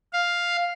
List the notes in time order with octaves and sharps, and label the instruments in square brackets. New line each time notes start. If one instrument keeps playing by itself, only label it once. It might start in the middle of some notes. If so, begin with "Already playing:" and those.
[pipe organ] F5